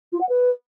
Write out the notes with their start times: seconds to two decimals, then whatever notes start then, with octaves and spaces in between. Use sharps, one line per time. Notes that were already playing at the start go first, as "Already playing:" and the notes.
0.12 F4
0.21 F#5
0.29 B4